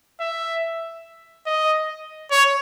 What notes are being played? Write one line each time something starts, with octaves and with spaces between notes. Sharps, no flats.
E5
D#5
C#5